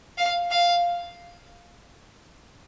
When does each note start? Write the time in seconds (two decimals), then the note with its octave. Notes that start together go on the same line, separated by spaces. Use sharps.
0.18 F5
0.51 F5